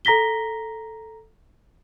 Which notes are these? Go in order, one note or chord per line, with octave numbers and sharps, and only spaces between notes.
A4 A#5 A#6 B6 G7